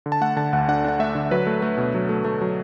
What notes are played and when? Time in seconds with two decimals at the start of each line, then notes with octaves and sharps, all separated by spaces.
0.06 D3
0.12 A5
0.21 A3 F#5
0.37 D3 A5
0.53 D2 F#5
0.68 D4 F#5
0.84 D4 F#5
0.99 A3 E5
1.15 D3
1.31 F#3 B4
1.47 A3
1.62 A3
1.78 B2
1.94 F#3
2.09 A3
2.25 A3
2.41 F#3